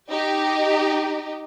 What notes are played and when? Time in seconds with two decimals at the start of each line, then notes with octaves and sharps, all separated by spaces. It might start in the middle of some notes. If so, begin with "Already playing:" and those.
0.10 D#4 G4